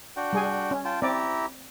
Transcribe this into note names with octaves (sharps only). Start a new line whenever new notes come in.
D4 F#4 G5
G3 G#4 G#5
C#4
F4 G5 A5
C4 E4 G4 D5 A#5